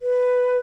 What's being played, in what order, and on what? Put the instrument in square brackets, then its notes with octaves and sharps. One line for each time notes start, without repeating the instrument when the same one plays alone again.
[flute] B4